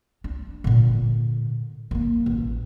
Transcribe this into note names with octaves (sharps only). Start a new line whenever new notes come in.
D4
A#2 D3
D#3 A#3
A1